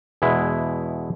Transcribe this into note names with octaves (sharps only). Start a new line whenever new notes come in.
E2 B2 G#3 E4